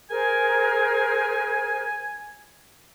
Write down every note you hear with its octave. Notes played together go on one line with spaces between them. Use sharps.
G#4 A#4 C5 G#5